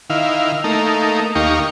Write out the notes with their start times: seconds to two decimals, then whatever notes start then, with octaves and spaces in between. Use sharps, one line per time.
0.10 D#3 E4 F5
0.64 A3 A#3 D#4
1.35 D#2 A#3 D#4 G4 F5 C#6